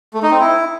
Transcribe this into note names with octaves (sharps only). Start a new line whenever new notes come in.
A3
D#4
C4
E4